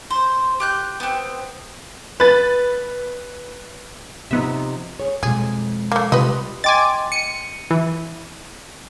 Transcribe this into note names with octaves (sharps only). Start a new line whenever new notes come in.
C5
G4 F#6 G6
B3 C4
B4 A6
C3 F3 B3 D#4 E5
G#4 C#5
F2 B2 G#3 G#4
A3 A#3
C3 G3 F4 B4 D#5
D#5 G5 G#5 C6 D6 A6
C#7 D#7
E3